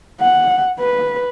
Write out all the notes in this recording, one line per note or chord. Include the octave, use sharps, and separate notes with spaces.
F#5
B4